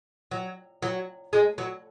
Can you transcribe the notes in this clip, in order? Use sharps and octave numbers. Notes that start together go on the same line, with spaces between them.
F#3
F#3
G#3
F#3